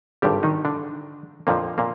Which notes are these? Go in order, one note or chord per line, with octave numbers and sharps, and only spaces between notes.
G#1 G2 D3 G3 G4
D#3 D#4
D3 D4
F2 A#2 D3 F3 A#3
A#2 A#3